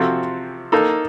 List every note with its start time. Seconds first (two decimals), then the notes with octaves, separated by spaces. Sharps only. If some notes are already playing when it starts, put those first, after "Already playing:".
Already playing: C3 F3 C4 F#4 A4
0.72 A#3 D#4 A4